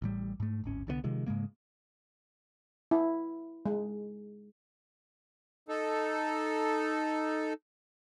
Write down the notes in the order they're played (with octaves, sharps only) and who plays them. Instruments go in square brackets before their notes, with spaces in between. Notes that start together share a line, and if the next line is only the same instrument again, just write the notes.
[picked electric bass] A1 A2 G3
G#2 A3
D1 G#1 C#4
C2 D3 G#3 B3
C3 D#3 F3 G#3
G#2 C#3 G#3 A#3
[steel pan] E4
G#3
[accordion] D#4 A4